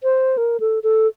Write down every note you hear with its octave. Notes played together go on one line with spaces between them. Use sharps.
C5
A#4
A4
A4